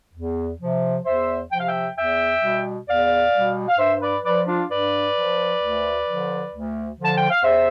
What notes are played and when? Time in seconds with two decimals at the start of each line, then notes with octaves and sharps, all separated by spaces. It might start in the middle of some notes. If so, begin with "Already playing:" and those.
0.14 E2
0.60 C3 F3
1.05 E2 C5 E5
1.51 C3 F3 G5
1.59 F5
1.67 E5 G5
1.96 E2 E5 G5
2.42 B2 G3
2.88 E2 D5 F5
3.33 B2 G3
3.68 F5
3.78 G2 C5 E5
4.02 B4 D5
4.24 F3 B4 D5
4.47 D4 F4
4.70 G2 B4 D5
5.16 F3
5.61 D2
6.07 D3 F3
6.53 D2
6.98 D3 F3 A5
7.17 G5
7.30 F5
7.44 E2 C5 E5